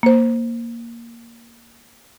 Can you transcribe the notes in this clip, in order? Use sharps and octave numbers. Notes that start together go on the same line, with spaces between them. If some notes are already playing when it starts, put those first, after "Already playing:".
A#3 C5